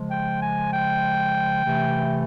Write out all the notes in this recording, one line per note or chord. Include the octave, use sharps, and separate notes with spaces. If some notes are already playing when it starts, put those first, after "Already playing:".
Already playing: C#3 F3 G#3
G5
G#5
G5
C3 E3 A3